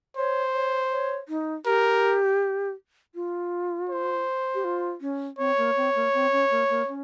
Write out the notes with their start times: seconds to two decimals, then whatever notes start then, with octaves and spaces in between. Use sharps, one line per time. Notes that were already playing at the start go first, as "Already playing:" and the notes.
0.16 C5 C#5
0.54 C#5
0.91 C#5
1.28 D#4
1.65 G4 A#4
3.15 F4
3.89 C5
4.55 G4
4.64 F4
5.01 C#4
5.38 C4 C#5
5.57 A#3
5.76 C4
5.95 A#3
6.14 C4
6.32 C#4
6.51 A#3
6.69 A#3
6.88 C#4